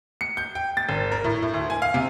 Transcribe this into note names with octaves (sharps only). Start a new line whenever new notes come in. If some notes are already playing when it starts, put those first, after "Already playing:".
C#7
G6
G5
A6
G#1
A#4
A2
A2
D2
G#5
F5
C3